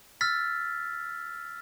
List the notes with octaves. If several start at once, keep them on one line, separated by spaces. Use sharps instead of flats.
E6 F6 A6 B6